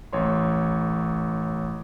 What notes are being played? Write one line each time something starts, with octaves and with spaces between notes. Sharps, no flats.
A1 C#5 C6